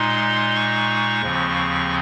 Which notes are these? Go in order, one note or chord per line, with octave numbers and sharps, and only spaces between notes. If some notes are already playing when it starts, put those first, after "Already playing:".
Already playing: A#2 G#3 D#4 C6
C#6
D#2 C#3 F3 C4